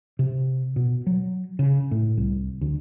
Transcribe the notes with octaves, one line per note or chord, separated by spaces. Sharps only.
C3
B2
F#3
C#3
A2
C2
D2